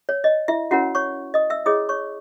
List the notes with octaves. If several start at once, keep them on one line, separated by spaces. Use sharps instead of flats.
C#5
D#5
E4 E5
C#4 E4 F#4 A#4 C#5 F#5
C#5 C#6
D#5 D#6
E5 E6
E4 G#4 C#5 D#5 D#6
C#5 C#6